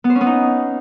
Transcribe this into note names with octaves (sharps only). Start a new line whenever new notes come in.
B3
C5
C#4
B3
D#4